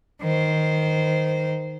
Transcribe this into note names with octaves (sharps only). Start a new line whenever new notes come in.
D#3 C5